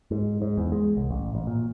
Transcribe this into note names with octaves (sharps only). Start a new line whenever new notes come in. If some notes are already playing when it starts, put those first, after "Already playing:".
G#2
G#2
E2
G#3
C2
A1
A1
A#2